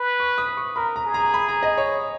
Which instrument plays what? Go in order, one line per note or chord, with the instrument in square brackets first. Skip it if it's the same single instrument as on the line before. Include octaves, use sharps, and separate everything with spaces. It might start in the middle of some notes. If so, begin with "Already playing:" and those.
Already playing: [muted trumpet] B4
[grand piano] C#6
D#6
C#6
[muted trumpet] A#4 [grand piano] B5
[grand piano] A#5
[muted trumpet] G#4
[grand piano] A#5
B5
A#5
D#5
C#5